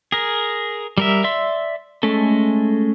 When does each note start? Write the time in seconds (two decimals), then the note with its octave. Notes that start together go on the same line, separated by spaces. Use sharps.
0.12 G#4 A#4
0.98 G3 A#4 E5
1.24 D5 E5 C6 E6
2.03 G#3 A3 C#4 A4